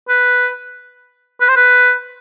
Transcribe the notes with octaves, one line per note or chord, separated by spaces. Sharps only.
B4
B4
C5
B4